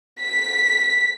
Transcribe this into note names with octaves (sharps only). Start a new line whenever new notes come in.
B6